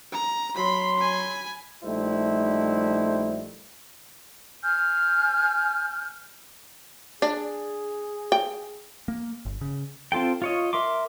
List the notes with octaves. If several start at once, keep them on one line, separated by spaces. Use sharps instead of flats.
A#5
F#3 B5 C6
G#5 B5
A#1 G3 A3 D#4 E4 C5
G#5 F6 G6
D4 G#4
G5
A#3
G1
C#3
C4 F4 A4 G5
F4 C#5 D#5
A#4 E5 C6 D6